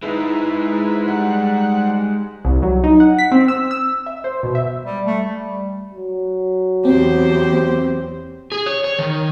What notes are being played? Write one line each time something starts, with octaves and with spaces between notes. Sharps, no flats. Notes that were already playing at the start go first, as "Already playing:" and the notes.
G#3 D#4 E4 B4
G3 F#5
C2
F#3
D#4
F#5
B6
C4
E6
E6
E5
C5
B2
E5
G3
A3
G3
F#3
E2 C4 G4 C5
G#4
C#5
C#5
D#3